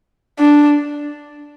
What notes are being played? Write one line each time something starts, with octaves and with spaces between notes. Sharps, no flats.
D4